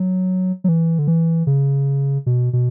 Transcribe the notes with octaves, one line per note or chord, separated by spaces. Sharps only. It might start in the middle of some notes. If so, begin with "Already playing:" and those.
Already playing: F#3
F#3
E3
D3
E3
C#3
B2
B2